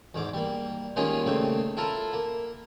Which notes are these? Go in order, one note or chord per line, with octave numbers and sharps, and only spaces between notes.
E2 G#2 D6
G3 A#3
D#3 G3 G#3 A#3 C#4 F4
C#3 A3 A#3 C4
E4 F4 A4 A#4
A#3